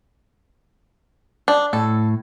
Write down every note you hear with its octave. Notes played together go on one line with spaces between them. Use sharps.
D4
A2 A4